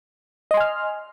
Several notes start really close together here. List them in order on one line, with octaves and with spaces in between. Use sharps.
D#5 C6 G#5 F6